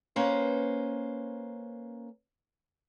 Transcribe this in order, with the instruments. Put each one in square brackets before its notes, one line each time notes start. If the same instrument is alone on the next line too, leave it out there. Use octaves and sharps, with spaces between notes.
[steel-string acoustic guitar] A#3 C#4 B4 C5